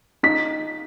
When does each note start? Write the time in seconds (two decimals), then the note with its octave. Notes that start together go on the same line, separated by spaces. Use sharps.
0.23 D#4 B6